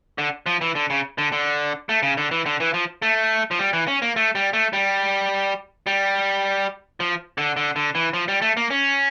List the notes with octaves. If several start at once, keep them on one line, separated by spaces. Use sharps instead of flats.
D3
F3
E3
D3
C#3
D3
D3
A3
C#3
D3
E3
D3
E3
F3
A3
F3
G3
E3
C#4
A#3
A3
G3
A3
G3
G3
F3
D3
D3
D3
E3
F3
G3
A3
A#3
C#4